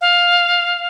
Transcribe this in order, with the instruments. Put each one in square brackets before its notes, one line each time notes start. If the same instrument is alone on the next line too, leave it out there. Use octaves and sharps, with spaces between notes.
[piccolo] F5